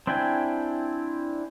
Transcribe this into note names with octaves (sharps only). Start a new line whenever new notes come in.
C4 D4 E4 G5 G#5